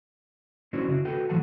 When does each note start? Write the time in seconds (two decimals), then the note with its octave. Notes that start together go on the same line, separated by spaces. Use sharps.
0.73 C#4 D4 E4 F#4 C5 C#5
0.88 C#3 F#4
1.05 F#4 A4 B4 G5
1.29 A2 E3 F3 A4 F#5 A5